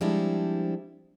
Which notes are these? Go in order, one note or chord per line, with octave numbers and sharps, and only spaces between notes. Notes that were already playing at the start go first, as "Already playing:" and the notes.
F3 G3 G#3 C4 D4 E4